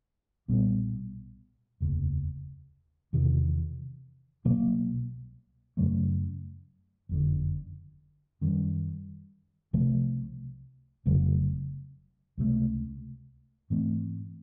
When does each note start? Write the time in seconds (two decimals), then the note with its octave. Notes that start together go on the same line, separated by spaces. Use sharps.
0.48 B1 A#2 G3 B3
1.80 F1 D#2 C#3
3.13 E2 C3 D#3
4.45 C2 B2 F#3 A#3
5.77 F#2 C#3 F#3 A3
7.09 F#1 F2 D3
8.41 F#2 D#3 G3
9.73 C2 C3 F3 A3
11.06 F1 F2 C#3 F#3
12.38 C#2 C3 E3 A3
13.70 G#2 E3 A3 C4